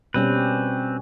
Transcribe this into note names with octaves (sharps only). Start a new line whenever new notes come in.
B2 G3 C4 C#4 B4